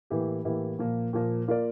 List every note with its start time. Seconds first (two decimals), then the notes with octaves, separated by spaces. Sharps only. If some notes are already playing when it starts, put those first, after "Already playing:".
0.10 A2 E3 A#3 E4 G4
0.44 A2 E3 A#3 E4 G4
0.79 A#2 F3 A#3
1.13 A#2 F3 A#3
1.48 A#3 F4 A#4 D5